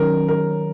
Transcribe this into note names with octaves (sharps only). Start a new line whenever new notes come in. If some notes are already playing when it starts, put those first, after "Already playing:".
Already playing: D#3 F#3 C#4 A#4
A#4